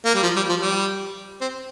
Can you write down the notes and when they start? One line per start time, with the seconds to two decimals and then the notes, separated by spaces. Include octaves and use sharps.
0.05 A#3
0.15 G3
0.23 F3
0.36 G3
0.49 F3
0.62 G3
1.41 C4